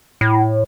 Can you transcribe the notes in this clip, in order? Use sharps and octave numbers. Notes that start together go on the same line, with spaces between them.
A2